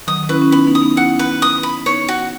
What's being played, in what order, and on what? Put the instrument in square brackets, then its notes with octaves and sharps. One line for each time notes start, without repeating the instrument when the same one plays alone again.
[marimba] D#3 F#3 [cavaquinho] D#6
[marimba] C#4 E4 [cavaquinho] B4
[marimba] C#4
[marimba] B3 D#4 [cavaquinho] B5
[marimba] B3 D#4
[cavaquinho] D#6
[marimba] B3 D#4
[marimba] C#4 E4 [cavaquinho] F#5
[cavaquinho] B4
D#6
B5
[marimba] B3 D#4 [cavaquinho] C#5
[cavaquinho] F#4